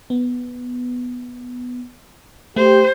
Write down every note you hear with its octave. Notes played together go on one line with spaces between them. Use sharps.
B3
A3 G4 C5